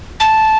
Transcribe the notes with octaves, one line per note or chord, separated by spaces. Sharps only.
A5